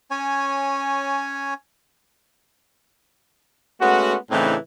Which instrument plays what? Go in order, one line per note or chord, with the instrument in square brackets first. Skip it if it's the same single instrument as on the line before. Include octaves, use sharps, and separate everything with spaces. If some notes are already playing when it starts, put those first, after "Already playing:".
[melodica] C#4 C#5 G#5
[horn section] G#3 A3 B3 C#4 F#4
A2 C#3 E3 C4 D4 D#4